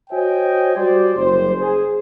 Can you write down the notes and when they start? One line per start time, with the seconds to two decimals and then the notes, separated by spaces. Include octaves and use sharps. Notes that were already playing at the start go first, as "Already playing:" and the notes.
0.10 F#4 C5 C#5 D#5 G5 G#5
0.75 G3 F#4 G4 C5 D5
1.16 F#1 C5
1.59 G#4